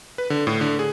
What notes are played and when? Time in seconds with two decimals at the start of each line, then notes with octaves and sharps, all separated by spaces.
0.18 B4
0.30 D3
0.47 A2
0.61 D3
0.79 G#4